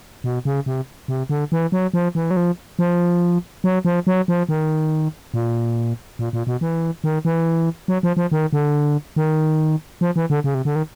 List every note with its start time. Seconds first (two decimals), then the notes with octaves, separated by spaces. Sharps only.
0.24 B2
0.45 C#3
0.66 C3
1.08 C3
1.29 D3
1.52 E3
1.72 F#3
1.94 F3
2.15 E3
2.31 F#3
2.37 F3
2.79 F3
3.64 F#3
3.85 F3
4.07 F#3
4.28 F3
4.49 D#3
5.34 A#2
6.19 A#2
6.33 A#2
6.47 B2
6.61 E3
7.04 D#3
7.25 E3
7.88 F#3
8.03 F3
8.17 F3
8.32 D#3
8.53 D3
9.16 D#3
10.01 F3
10.16 E3
10.30 D3
10.44 C#3
10.54 C3
10.65 D3
10.76 D#3